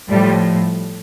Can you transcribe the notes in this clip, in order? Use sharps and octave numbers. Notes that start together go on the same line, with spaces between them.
A2 F3 G3